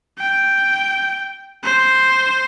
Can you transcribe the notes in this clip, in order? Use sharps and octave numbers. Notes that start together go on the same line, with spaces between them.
G5
C5